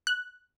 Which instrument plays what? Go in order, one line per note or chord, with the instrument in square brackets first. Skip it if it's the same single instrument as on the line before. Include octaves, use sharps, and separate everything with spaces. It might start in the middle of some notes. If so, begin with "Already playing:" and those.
[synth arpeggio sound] F#6